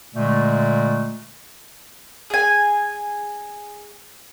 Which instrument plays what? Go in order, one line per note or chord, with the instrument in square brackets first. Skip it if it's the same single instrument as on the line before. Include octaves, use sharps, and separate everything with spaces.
[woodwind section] A#2 D3 G#3 A3
[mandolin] G#4 G#5